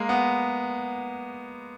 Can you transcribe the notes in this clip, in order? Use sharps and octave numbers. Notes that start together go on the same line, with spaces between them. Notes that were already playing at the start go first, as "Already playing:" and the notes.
Already playing: G#3 A#3
B3